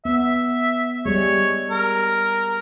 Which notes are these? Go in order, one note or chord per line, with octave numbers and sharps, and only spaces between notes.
B3 E5
G3 G#3 C#5
A#4